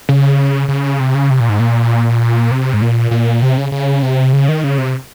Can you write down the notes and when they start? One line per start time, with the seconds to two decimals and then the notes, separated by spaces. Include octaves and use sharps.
0.09 C#3
0.69 C#3
1.00 C3
1.14 C#3
1.30 C3
1.40 A#2
1.49 G#2
1.60 A#2
2.51 C3
2.74 G#2
2.82 A#2
3.11 A#2
3.42 C3
3.58 C#3
3.72 C#3
4.02 C3
4.33 C#3
4.49 D#3
4.64 C#3
4.78 C3